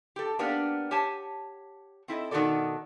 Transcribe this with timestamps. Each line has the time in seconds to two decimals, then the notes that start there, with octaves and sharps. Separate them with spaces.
0.16 G4 A4
0.39 A#3 B3 D4 G4 A#4
0.91 G4 C#5 G#5 A5
2.08 C4 E4 A4 D#5
2.31 B2 D#3 D#4 F#4 A4 D5